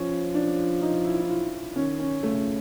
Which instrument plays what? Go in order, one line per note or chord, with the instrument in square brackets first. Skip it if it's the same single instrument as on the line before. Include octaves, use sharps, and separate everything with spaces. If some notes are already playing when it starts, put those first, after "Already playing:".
Already playing: [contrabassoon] F3 [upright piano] C#4
[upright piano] D4
D#4
E4
E4
F4
[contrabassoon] D#3 [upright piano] C#4
[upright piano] C#4
[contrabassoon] C#3 [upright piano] A3